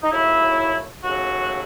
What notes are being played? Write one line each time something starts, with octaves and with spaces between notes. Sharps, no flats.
D#4
D#2 C#3 F#3 A3 E4
D#2 C#3 F#3 A3 F#4